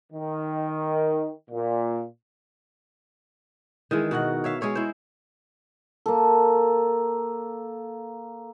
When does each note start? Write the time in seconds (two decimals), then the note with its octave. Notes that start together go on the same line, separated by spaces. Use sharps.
0.13 D#3
1.50 A#2
3.91 D#3 E3 G#3
4.11 B2 F#4 A#4 F#5
4.44 C#5 E5 F5
4.61 G#3 G#4 C#5 F5
4.75 E4 C5
6.06 A#3 A4